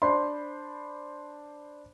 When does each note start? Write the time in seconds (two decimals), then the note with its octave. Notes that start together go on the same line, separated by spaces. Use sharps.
0.02 D4 C5 B5 C6